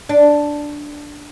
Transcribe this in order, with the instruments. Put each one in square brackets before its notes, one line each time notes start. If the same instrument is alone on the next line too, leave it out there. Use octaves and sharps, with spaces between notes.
[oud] D4